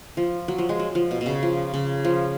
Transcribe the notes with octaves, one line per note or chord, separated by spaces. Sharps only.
F3
F#3
F3
G#3
F#3
F3
B2
B2
C#3
F3
C#3
F3